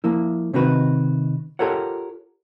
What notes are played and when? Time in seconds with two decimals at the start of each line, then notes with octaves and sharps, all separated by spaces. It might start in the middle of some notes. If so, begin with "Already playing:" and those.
0.04 F3 A#3 E4
0.53 C3 D#3 C4 D#4 F#4 B4
1.59 F4 G4 A4 A#4 C#5 F#5